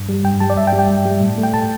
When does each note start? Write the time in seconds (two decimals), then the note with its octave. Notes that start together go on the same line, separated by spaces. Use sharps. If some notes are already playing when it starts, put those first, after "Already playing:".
Already playing: G2
0.09 G3
0.24 G2 G5
0.40 G3 A5
0.50 D5
0.57 G2 E5
0.67 G5
0.73 G3
0.79 G5
0.89 G2
1.06 G3
1.21 A2
1.38 A3
1.43 G5
1.54 A2 A5